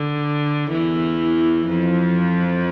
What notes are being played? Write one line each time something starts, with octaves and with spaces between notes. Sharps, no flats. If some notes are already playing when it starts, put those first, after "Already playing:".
Already playing: D3
E2 E3
F2 F3